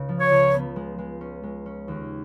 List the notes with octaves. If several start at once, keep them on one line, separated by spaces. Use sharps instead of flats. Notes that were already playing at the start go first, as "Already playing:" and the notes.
Already playing: C#2 C#3
F3
C#5
C#2
B3
G#3
G#3
C#4
G#3
C#4
D#2